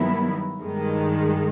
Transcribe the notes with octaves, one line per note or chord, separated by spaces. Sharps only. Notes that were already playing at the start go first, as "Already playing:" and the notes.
Already playing: G2 D#3 F#3 B3 E4
G2 D#3 G#3